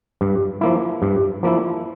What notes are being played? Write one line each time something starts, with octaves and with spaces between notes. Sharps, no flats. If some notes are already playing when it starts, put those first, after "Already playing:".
G2
F3 A#3 E4
G2
F3 A#3 E4